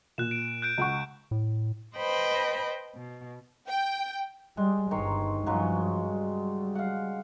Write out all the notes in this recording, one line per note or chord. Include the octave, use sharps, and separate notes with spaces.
A#2 F#6 E7
D7
F#6 G6 D7
C#2 F#5 C#6
A2
B4 C5 D#5 G5 A5 B5
B2
G5
G3 G#3
G1 G2 D#3 C5 C#5
G2 C#3 F3 F#3 G#3
G3
F5 F#5